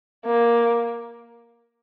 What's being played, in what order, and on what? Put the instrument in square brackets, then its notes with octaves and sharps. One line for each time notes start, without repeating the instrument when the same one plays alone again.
[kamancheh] A#3